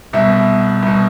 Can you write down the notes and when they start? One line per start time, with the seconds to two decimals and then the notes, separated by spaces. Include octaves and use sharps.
0.13 C2 B2 E5
0.83 C2 B2